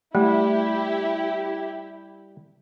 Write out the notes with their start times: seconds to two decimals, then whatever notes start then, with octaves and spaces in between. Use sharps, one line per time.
0.15 G3 A3 E4 G4